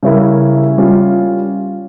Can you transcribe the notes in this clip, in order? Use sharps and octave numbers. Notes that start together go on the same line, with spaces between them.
C#3 G3 C#4 E4 A#4
G3 C#4 F4